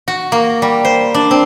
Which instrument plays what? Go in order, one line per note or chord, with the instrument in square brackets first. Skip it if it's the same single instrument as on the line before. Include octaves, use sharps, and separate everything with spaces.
[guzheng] F#4
A#3
G3
C5
D4
C4